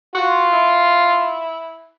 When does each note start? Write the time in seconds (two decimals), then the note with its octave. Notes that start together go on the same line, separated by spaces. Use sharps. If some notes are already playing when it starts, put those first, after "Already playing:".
0.15 F4 F#4
0.53 E4